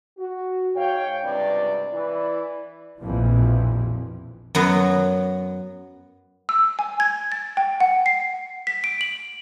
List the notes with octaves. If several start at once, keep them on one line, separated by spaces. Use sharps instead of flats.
F#4
G#2 C#5 F5 G5
C#2 G2 C3 D5
E3 E4 B4 D5
A#1 F2 B2 E3 F3
F#2 F#3 B3
E6
G#5
G#6
A6
G5
F#5
C7
B6
D7
F#7